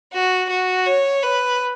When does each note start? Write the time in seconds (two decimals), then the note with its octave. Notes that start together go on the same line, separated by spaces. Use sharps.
0.13 F#4
0.50 F#4
0.86 C#5
1.22 B4